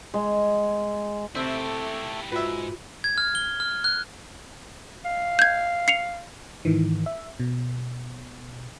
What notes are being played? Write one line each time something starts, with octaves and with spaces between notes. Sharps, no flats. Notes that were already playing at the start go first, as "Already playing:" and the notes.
G#3
C3 A3 C4 E4 G4 A4
G#2 F4 F#4 B4 E5
G#6
F6
G7
F6
F#6
F5
G6 G#6
C7 C#7 F7
G#2 D#3 E3
E5
B2